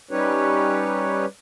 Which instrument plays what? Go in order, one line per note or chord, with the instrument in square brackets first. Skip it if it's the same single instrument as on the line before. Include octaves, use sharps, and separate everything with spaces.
[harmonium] G3 C#4 D#4 G4 B4 C#5